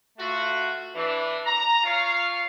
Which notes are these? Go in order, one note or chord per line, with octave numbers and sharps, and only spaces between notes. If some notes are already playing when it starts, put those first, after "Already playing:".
A3 F4 F#4
E3 D4
A#5
F4 C#5 F5